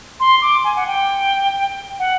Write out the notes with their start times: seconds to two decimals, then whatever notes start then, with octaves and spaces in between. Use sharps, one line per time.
0.20 C6
0.42 D6
0.64 G#5
0.76 F#5
0.87 G5
1.99 F#5